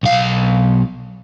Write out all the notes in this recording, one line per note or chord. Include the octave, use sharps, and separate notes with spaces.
B1 F5